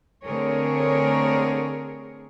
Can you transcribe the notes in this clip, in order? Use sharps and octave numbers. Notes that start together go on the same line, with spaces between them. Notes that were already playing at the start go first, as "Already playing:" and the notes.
D3 A3 C4 G#4 A#4 C#5